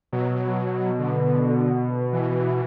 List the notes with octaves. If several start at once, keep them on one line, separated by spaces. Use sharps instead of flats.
B2 F#3
D3
E3